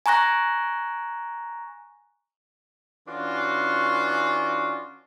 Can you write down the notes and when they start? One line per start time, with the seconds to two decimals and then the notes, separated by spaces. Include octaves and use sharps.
0.06 G#5 A#5 C#6 F#6 A#6
3.08 E3 C#4 D4 F4 F#4